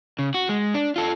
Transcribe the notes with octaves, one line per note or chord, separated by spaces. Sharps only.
C#3
F#4
G#3
D4
F4 A4